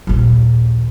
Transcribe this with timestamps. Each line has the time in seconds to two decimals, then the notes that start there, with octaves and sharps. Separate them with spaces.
0.07 A#1 D#2